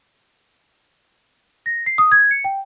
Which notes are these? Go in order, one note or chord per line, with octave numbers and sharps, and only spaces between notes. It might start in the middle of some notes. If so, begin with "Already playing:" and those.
A#6
C7
D#6
G#6
C#7
G5